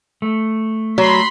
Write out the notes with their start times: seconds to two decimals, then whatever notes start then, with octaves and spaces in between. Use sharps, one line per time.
0.22 A3
0.98 F#3 B5 C6 B6